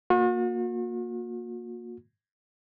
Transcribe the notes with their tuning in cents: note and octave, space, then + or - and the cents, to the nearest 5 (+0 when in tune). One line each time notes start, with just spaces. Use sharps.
A#3 +0 F#4 -45